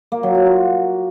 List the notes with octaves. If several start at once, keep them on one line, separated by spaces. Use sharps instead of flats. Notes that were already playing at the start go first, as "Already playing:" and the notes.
A#3
F#3
F4
F#4